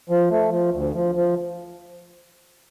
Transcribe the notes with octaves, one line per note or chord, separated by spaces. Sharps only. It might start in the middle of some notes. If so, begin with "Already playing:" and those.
F3
A3
F3
D2
F3
F3